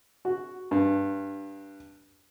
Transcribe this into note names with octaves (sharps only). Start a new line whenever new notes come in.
F#4
G2